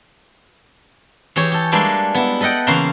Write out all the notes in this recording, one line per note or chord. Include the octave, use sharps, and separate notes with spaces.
E3 G4 G#4 C#5
G4 A4
G3 G#3 A#3 D4 A4 B4
B3 E4
A4 B4 D#5 F#5 G5
C#3 E3 A#3 F5 B5 C6